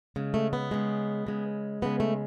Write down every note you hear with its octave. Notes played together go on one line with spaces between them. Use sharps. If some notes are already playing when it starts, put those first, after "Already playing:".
C#3 G#3
A3
B3
C#3 G#3
C#3 G#3
C#3 G#3 B3
A3